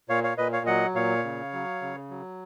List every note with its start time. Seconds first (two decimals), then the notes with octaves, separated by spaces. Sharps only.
0.09 A#2 C#5 F5
0.24 C#5 F5
0.38 A#2 B4 D#5
0.53 C#5 F5
0.66 F#3 D#5 F#5
0.95 A#2 C#5 F5
1.24 C#3
1.53 F#3
1.82 C#3
2.10 F#3